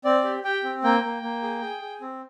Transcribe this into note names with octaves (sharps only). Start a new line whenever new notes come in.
C4 D5
G4
G4 G5
C4
A#3 G5
A#3
A#3
G#4
G#4
G#4
C4